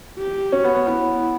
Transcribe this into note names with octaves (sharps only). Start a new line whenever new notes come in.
G4
C#4 F#4
B3
B3
B3 E4